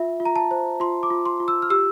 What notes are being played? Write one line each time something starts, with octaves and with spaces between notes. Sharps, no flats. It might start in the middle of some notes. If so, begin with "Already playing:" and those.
Already playing: F4 E5
F4
A#5
A5
C5
F4 C6
D6
F4
C6
F4
E6
F6
G4 E6